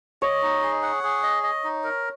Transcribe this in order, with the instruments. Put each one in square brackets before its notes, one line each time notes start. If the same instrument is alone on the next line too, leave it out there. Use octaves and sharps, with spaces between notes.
[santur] C#5 [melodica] D#5
[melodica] D#4
G#4
F#5
G#4
D#5
D#5
D#4
A#4